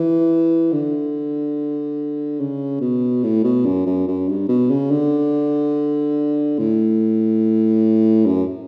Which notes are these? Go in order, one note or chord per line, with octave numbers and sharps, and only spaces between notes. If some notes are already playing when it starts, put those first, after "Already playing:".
Already playing: E3
D3
C#3
B2
A2
B2
F#2
F#2
F#2
G2
B2
C#3
D3
A2
F#2